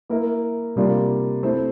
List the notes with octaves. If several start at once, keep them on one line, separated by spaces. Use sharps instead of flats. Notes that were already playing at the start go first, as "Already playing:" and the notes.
A#3 E4 A#4 E5
C3 G3 A#3 D4 F4
A3 C4 E4 A4 C5